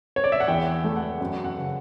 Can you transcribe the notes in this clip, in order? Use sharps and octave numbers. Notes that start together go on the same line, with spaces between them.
C#5
D5
E5
F#5
E2 G5
A3
F#5
F#2
F#5
C#3